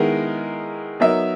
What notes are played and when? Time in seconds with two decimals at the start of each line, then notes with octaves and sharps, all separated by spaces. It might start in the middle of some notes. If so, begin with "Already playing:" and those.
Already playing: D#3 G#3 B3 E4 A#4
1.00 F#3 B3 D#4 A#4 E5